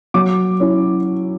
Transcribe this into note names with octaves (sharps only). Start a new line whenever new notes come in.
F#3 D6
C#4 E4